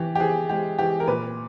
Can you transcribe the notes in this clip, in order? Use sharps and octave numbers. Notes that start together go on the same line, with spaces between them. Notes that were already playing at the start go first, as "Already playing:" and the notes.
Already playing: E3 G4
G4
E3 G#4
G#3 G4
E3 G4
A#4
A#2 B4